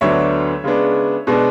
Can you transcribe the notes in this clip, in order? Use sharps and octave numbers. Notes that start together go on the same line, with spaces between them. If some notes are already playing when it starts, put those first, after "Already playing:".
D2 D3 F#3 B3 D4 C#5 E5
C#3 G#3 B3 D4
B2 G#3 B3 D4